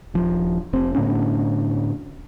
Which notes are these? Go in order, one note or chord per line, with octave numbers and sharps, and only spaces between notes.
D#1 F3
F1 C4
A2 D3 B3 C#4